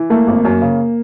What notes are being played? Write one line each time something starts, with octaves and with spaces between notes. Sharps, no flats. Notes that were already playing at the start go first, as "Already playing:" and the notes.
Already playing: E3
A3 A#3
G#1
F#2
C#3